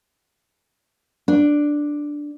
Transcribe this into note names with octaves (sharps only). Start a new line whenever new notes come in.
D4